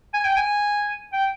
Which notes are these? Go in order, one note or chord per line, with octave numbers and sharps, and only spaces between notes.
G#5
G5
G#5
G5